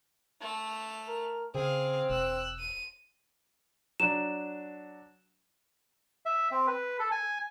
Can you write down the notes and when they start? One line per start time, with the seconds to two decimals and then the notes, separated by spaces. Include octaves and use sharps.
0.41 A3 F7
1.08 A#4
1.55 C#3 C4 G#4 F5
2.10 E1 E6 F#6
2.59 D#7
4.00 F#3 D4 E7
6.26 E5
6.51 C4
6.67 B4
6.99 A4
7.12 G#5